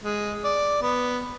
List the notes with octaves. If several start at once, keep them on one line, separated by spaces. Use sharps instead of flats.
G#3
D5
B3